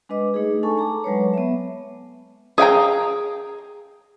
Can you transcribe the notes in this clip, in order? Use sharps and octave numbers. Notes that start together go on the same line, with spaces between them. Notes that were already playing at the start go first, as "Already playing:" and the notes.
G#3 D4 B4 D#5 D6
A3 D#4 G#4
D4 A4 G#5 A5 C#6
A5 A#5 D6
F#3 G#3 B4 C#5
B3 E5
G#4 F5 G5 A#5